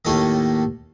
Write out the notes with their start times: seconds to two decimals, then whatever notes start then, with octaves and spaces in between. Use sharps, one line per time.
0.05 D#2 A2 A3 A#3 D#5